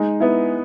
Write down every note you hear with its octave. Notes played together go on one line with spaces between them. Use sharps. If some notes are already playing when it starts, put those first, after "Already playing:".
Already playing: G#3 D#4
B3 E4